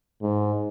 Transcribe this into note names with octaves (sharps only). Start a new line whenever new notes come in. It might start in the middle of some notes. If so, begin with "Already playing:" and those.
G#2